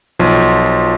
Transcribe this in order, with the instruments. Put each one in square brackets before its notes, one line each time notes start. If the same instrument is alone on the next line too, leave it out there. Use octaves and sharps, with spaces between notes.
[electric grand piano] B1 F3